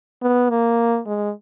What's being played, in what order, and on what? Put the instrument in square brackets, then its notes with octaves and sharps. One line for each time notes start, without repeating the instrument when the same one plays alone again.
[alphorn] B3
A#3
G#3